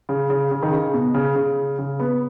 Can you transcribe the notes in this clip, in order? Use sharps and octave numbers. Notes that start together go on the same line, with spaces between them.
C#3
C#3
C#3
D#3
C#3
B2
C#3
C#3
C#3
B3